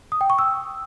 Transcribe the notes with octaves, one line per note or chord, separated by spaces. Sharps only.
D#6
G5
C#6
E6